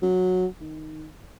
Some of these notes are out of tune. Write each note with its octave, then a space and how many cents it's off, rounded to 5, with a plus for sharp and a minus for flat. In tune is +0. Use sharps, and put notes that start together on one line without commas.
F#3 -10
D#3 +0